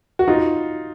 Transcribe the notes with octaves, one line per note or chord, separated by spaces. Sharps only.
F#4
D#4 F4